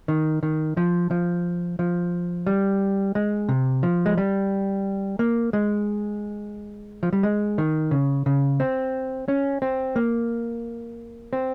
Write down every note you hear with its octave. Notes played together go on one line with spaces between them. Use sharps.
D#3
D#3
F3
F3
F3
G3
G#3
C3
F3
G#3
G3
A#3
G#3
F3
G3
G#3
D#3
C#3
C#3
C4
C#4
C4
A#3
C4